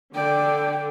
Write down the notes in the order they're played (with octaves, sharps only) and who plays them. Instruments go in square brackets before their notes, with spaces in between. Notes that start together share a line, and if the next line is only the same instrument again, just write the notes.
[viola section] D3 [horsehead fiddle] D5 [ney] G5